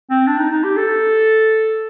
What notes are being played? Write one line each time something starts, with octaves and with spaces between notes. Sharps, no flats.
C4
D4
D#4
D#4
G4
A4